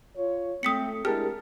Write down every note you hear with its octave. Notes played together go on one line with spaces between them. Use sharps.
F4 C#5
A3 C4 D#6 B6 C#7
G#3 D4 E4 G4 G#4 A#4 A5 F6